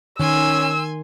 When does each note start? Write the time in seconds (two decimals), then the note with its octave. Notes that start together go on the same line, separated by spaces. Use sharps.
0.20 D#3 C#4 G#5 C6 E6